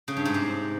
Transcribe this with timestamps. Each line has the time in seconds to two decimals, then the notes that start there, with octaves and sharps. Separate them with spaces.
0.08 C#3
0.17 G2
0.25 G#2
0.34 C3